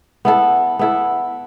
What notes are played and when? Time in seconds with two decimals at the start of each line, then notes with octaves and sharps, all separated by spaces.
0.25 B3 E4 A4
0.79 B3 E4 A4